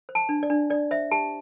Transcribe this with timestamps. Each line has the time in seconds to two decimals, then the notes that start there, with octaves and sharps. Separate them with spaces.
0.09 C5
0.15 A5
0.29 D4
0.43 D5
0.50 D4
0.70 D4 D5
0.91 C5 E5
1.11 G4 A5